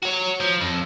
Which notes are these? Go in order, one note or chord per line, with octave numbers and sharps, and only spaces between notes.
F#4 C#5
F3
F2